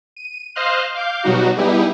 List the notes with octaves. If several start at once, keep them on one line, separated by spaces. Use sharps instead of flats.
D#7
C5 D#5 F5 C6 F6 F#6
F5 D6 G6
B2 F#3 G3 D#4 F#4
G3 B3 D#4 E4 G4 G#4